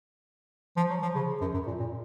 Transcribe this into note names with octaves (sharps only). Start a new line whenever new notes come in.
F3
F#3
F3
C#3
F#2
F#2
A#2
A#2